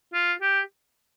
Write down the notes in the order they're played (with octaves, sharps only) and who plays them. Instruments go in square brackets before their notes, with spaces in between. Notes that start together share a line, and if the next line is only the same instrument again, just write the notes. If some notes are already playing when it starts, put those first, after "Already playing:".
[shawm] F4
G4